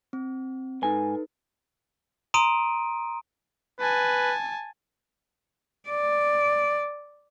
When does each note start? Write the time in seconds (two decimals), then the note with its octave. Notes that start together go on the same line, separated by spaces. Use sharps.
0.13 C4
0.82 G#2 D#4 A4 B4 G#5
2.34 A#5 C6 D#6 D7 D#7
3.80 B4 G#5 A5
5.89 D5